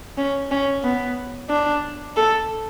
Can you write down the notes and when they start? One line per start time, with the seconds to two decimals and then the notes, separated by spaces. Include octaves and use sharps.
0.18 C#4
0.51 C#4
0.84 B3
1.50 D4
2.16 A4